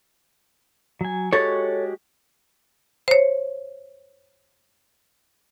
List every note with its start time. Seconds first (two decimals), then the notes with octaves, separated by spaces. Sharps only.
1.01 F#3 G#5
1.33 G#3 F#4 G4 A4 C#5
3.08 C5 C#5